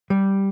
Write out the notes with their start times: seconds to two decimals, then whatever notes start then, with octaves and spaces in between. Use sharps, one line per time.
0.10 G3